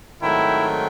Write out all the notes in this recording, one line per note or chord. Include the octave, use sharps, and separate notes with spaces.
G#2 D#3 F#3 A3 C4 E4